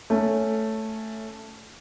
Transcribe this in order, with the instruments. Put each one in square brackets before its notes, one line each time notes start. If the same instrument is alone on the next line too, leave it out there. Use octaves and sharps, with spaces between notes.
[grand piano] A3 C#4